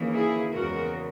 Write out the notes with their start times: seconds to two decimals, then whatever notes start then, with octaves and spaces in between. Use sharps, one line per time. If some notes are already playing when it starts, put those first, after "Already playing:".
Already playing: D#2 C#3 E3 A#3
0.14 E4 G#4
0.53 E2 C#3 G#3 F#4 A#4